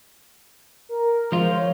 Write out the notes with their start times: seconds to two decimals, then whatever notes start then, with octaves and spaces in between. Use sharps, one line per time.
0.89 A#4
1.32 F3 G#3 F4 C5
1.52 C#5